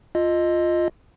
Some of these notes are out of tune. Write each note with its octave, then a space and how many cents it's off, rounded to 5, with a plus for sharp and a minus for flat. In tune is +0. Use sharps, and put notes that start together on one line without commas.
F4 +0 D#5 +0